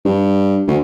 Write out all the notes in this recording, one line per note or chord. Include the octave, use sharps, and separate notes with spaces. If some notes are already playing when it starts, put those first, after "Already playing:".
G2
D2